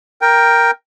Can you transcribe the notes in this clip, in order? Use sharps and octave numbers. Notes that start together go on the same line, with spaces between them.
A#4 G5